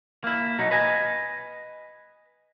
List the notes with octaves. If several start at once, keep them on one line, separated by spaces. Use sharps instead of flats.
A#3 E4
B2 F#3 D#4
B4 D#5 G#5